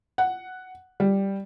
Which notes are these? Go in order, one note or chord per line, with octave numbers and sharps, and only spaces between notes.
F#5
G3